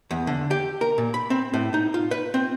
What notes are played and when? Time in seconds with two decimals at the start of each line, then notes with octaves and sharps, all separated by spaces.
0.11 E2
0.27 D3
0.51 G4
0.81 A#4
0.98 A#2
1.14 B5
1.30 C4
1.54 A2
1.74 D#4
1.94 F4
2.11 B4
2.34 C4